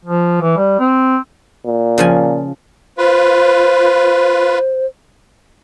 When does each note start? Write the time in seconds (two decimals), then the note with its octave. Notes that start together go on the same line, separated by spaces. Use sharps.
0.05 F3
0.41 E3
0.57 G3
0.79 C4
1.66 A#2
1.98 C#3 F3 G#5
2.98 F4 B4 C5